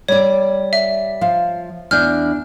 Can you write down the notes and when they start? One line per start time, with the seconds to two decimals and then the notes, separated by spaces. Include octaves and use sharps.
0.08 G3 C#5 D5
0.73 E5
1.21 F3 F5
1.91 E2 D4 F6 G6